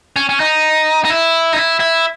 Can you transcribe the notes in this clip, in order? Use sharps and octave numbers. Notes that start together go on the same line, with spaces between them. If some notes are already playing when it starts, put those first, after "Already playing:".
C#4
C#4
D#4
D#4
E4
D#4
E4
E4